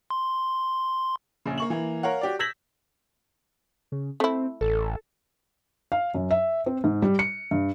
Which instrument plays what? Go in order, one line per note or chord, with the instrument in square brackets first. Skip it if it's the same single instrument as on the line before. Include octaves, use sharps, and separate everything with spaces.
[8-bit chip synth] C6
[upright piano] A#1 C#3
A#3 C#6 F#7
E3 A#3
A#4 C#5 F5 F#5
F#4 G4 D5
E6 G6 G#6 A#6 B6 F#7
[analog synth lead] C#3
[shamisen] A3 E4 [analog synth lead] C4
[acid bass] A1 [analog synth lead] A4
[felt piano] F5
F#2
E5
C4
G#2
G3
C#7
G2